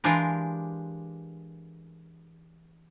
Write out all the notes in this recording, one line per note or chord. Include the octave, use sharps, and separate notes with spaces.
E3 G#3 D4 F4 G4 A#4